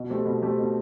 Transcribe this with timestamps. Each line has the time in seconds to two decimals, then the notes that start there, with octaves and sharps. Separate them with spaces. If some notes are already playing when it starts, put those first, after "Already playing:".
Already playing: B2
0.10 A3 C4 G4
0.25 B2
0.42 A3 C4 G4
0.58 B2